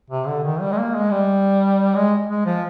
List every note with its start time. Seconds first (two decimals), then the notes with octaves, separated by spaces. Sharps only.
0.10 C3
0.27 D3
0.44 D#3
0.61 G3
0.72 G#3
0.78 A#3
0.95 G#3
1.11 G3
1.96 G#3
2.28 G#3
2.46 F3